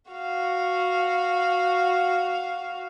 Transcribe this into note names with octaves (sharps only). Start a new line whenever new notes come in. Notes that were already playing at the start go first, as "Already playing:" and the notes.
F#4 F5